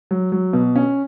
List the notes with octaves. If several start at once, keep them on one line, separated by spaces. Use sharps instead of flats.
F#3
F#3
B2
C#4